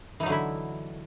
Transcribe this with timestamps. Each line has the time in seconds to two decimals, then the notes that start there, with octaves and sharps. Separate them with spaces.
0.20 E3
0.23 D#4
0.26 F#3
0.29 D3
0.32 E4